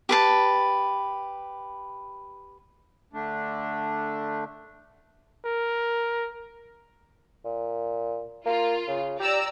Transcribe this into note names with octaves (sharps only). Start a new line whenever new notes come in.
G4 B4 A5
D3 A3 D4
A#4
A#2
A#3 F4
C#3
G4 D5 A#5 E6